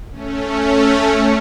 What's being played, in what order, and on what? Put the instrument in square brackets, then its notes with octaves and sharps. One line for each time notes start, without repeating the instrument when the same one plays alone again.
[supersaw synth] A3 C#4